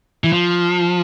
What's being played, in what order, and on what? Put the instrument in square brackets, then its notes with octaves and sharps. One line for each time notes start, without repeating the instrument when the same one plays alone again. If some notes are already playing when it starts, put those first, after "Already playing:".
[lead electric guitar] E3
F3